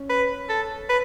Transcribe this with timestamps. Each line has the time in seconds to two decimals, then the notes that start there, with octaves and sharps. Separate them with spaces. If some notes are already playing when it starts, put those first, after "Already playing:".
Already playing: C#4
0.09 B4
0.49 A4
0.89 B4